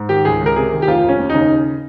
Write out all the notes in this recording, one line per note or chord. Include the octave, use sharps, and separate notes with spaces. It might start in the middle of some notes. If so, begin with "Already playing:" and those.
Already playing: G#2
D#3 G4
C#2 G#4
C#2
A#4
C3 G#4
D#3
G4
F1 F4
F1 C#4
D#2
D#4
C#3